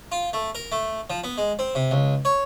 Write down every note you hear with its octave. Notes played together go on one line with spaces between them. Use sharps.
F4
A3
A#4
A3
F3
B3
G#3
C4
C3
C#2
C#5